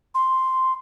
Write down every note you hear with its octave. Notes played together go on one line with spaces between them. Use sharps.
C6